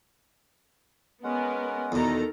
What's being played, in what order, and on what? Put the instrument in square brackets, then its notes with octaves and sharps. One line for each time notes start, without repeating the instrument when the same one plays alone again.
[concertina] G#3 C#4 F#5 [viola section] B3 A#4
[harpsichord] E2 B2 [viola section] D#3 A4 A#5